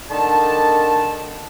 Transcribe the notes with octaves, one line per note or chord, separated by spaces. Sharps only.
D3 D#3 A5